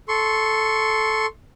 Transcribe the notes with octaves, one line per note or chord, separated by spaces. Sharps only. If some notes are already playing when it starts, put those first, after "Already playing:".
A4 C6 C#6